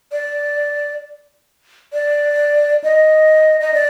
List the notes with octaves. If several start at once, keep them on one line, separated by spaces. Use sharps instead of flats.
D5
D5
D#5
D#5
D5